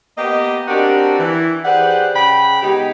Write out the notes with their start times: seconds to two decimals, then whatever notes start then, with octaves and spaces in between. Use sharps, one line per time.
0.18 A#3 B3 G4 D#5
0.68 C4 D4 F#4 G4 A#4
1.19 E3
1.64 G4 G#4 B4 C5 D5 F#5
2.15 C#3 G5 B5
2.62 G#3 B3 D#4 G4